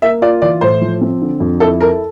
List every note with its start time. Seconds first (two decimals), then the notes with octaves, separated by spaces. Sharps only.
0.02 A#3 E5
0.22 F4 D5
0.42 E3 D5
0.61 A2 C5
0.81 F3
1.01 C4
1.22 D3
1.40 F2
1.60 E4 A4
1.81 A4 A#4